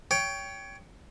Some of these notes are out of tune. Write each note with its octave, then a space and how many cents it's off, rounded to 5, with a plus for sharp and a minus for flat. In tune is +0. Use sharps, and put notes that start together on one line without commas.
C#5 +20 G5 +0